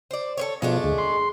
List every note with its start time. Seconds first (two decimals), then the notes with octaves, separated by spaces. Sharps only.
0.11 C5 D5
0.37 A4 C5 C#5
0.62 B2 F3 G#3 A3 D4 F5
0.84 D2 G#4
0.98 C6